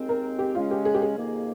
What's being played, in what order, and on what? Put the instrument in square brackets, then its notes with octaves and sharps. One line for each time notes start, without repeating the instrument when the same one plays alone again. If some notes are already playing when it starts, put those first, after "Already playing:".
Already playing: [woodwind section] D#2 D#3 G#3 C4
[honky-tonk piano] A#4
G4
[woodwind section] C#3 G#3 C#4 [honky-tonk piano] F4
[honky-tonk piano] G4
G#4
G4
G#4
[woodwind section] F2 C3 D#3 A#3